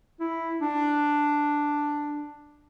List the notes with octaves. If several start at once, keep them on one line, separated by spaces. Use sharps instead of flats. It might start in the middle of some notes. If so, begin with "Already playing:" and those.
E4
D4